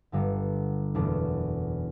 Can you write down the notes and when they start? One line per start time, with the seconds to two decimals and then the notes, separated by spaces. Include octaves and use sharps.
0.12 G1 G2 D3
0.95 F#1 E2 B2 A3 D4